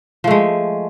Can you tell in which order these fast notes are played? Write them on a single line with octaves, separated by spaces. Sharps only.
F3 A3 G#3